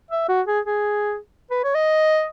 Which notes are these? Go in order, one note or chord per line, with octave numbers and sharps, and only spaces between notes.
E5
F#4
G#4
G#4
B4
C#5
D#5